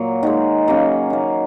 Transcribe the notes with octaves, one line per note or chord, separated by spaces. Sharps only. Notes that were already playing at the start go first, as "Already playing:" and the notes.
Already playing: A#2 F#3 A#3
D#3 G#3
C#3 F#3 A#3
D#3 A#3